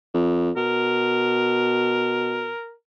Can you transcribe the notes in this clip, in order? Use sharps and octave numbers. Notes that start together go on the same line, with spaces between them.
F2
B2 A#4